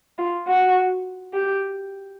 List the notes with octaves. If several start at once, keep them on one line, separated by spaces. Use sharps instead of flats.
F4
F#4
G4